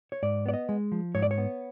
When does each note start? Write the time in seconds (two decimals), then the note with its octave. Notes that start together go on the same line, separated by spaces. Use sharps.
0.12 C#5
0.23 G#2 D5
0.46 B3 D5
0.54 D#5
0.69 G#3
0.92 F3
1.15 G#2 C#5
1.23 D5
1.31 C#5
1.38 B3